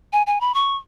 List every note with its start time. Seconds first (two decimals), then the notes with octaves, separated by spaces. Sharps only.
0.13 G#5
0.27 G#5
0.41 B5
0.54 C#6